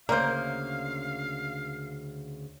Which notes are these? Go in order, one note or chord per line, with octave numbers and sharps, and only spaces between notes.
D2 C#3 A#3 A#4 C5 D5 F5